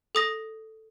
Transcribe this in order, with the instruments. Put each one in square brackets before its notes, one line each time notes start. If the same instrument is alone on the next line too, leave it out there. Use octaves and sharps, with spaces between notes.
[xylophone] A4 D#6 A#6